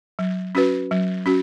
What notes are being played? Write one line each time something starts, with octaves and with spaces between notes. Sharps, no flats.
F#3
C#4 F#4 B4
F#3
C#4 F#4